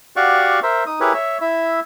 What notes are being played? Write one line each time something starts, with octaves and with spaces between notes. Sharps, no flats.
F#4 G4 D5 F5 F#5 C#6
A#4 C5 E5
D#4 D#6
E4 G4 G#4 A#4 B4 C#5
C#5 E5
E4 E5